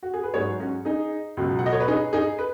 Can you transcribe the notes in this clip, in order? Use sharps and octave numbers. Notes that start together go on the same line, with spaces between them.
F#4
G#4
B4
G#2 F#3 G#4 C#5
C#4 F#4
D#4 G#4
C#2 B2 F#3
F#5
D#5
C#5
B4
D#4 G#4
D#4 G#4
B4